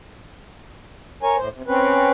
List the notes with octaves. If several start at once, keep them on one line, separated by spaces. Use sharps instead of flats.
A#4 C#5 G#5
A2 C5
C3
C4 C#4 B4